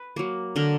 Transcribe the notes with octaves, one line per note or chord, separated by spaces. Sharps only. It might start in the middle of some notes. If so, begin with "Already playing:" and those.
Already playing: B4
F#3 A#3
D3 A#4